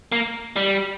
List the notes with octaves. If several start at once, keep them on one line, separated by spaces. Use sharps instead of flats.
A#3
G3